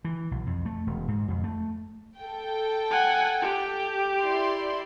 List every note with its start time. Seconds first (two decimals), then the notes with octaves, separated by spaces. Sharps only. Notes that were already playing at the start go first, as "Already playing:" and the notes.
0.05 E3
0.31 B1
0.47 F2
0.65 A3
0.87 E1
1.08 G#2
1.28 F2
1.44 A3
2.20 A4 G5
2.91 F#5 G#5
3.42 G4
4.21 E4 D5 C6